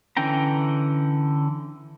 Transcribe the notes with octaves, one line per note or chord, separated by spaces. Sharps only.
D3 E3 C#4 G5 A#5